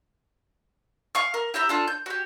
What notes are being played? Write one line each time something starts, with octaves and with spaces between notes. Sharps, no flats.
F5 C#6 F6
A#4
E4 G4 E5 A#5
D4 F4 A4
G6
F#4 G4